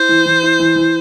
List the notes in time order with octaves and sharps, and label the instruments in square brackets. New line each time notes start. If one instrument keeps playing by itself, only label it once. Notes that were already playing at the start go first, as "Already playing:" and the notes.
Already playing: [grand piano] E4 [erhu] C5
[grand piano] E3
E3
E4
E3
E3